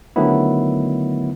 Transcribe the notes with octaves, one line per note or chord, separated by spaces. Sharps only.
D3 D#3 F#3 A3 B3 E4